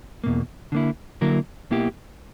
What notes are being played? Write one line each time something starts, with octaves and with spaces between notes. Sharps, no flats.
E2 B2 A#3
D3 A#3 E4
D3 F#3 A#3 E4 A#4
B1 B2 A#3 E4 G4